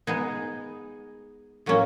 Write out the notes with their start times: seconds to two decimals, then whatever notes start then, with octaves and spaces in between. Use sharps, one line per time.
0.07 G#3 B3 D#4 G#4
1.66 A2 F#3 A#3 C#4